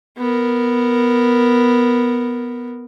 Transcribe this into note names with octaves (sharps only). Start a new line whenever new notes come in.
B3 A#4